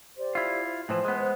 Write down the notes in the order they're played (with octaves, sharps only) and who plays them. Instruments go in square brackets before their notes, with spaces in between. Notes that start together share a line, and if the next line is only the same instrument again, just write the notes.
[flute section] G4 C5 D5
[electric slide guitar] E4 F4
[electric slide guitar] A2 E3 F3 [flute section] C5
[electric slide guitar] G#3 B3
[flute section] C5